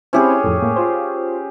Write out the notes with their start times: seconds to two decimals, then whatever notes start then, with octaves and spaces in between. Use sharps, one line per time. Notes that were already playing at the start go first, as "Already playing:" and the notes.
0.13 C4 C#4 E4 G4 G#4 C5
0.44 F2 A2
0.62 A2 A3 A#3
0.76 F4 C5